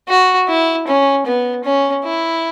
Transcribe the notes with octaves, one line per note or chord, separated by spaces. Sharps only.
F#4
E4
C#4
B3
C#4
E4